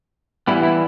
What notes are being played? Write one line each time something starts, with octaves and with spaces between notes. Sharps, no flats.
E3 G3 B3 E4
E4